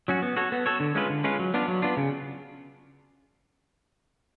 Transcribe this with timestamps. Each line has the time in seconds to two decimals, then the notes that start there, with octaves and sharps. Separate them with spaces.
0.08 F#3 C#4 F#4
0.22 B3
0.37 F#4 A4 C#5
0.52 B3
0.66 F#4 A4 C#5
0.80 D3
0.95 G#3 C#4 F4 B4
1.10 D3
1.24 G#3 C#4 F4 B4
1.39 F#3
1.54 B3 D4 F4
1.68 F#3
1.82 B3 D4 F4
1.97 C#3